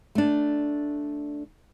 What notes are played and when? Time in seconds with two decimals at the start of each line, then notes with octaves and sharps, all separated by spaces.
0.15 A3 D4